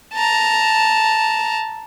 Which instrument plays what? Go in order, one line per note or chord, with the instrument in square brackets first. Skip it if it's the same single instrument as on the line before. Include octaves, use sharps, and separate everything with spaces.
[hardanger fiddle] A5 A#5